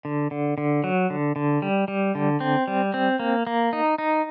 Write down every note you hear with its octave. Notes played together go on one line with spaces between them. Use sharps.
D3
D3
D3
F#3
D3
D3
G3
G3
D3
C4
G3
C4
A#3
A#3
D#4
D#4